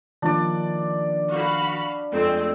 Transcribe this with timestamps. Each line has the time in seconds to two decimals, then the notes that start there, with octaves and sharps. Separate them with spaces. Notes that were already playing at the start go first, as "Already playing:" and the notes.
0.22 D#3 F3 A#3 D4 D5
1.31 F#4 F5 B5
2.13 F2 G#3 A3 C4